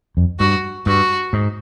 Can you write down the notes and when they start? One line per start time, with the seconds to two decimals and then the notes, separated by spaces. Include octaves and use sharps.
0.17 F2
0.39 G2 F#4
0.86 G2 F#4
1.33 G#2